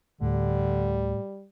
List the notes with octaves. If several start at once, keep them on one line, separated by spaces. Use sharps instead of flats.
D2 A2 D3 G3